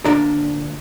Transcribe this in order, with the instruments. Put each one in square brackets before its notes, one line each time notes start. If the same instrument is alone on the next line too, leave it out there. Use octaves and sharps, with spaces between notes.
[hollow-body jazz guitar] D2 A#2 D4 A#4 D5